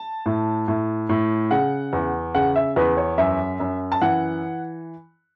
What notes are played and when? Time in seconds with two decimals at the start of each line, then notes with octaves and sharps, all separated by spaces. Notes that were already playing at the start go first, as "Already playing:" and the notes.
Already playing: A5
0.26 A2
0.68 A2
1.09 A2
1.51 C#3 F#5
1.93 E2
2.35 C#3 F#5
2.56 E5
2.76 E2 B4
2.97 C#5
3.18 F#2 E5
3.60 F#2
3.92 A5
4.02 E3 F#5